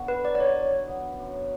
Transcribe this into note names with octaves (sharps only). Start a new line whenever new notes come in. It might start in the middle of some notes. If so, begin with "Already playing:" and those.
Already playing: D3 B3 F#4
B4
F#3 D5
D5
C#5
E3
B3
F#2